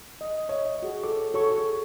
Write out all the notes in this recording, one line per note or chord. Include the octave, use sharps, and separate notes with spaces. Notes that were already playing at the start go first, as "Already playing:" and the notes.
D#5
C#5 D#5 E5
F#4 G#4
A4 D6
F#4 A4 C#5 C#6
G#4